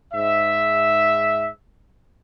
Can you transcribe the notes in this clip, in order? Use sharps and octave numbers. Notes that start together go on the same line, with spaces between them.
G#2 E5